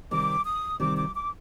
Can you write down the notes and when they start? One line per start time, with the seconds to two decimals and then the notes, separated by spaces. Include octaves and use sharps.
0.11 C3 D#3 G3 C4 D6
0.46 D#6
0.80 C3 D#3 G3 C4 D6
0.97 D6
1.14 D6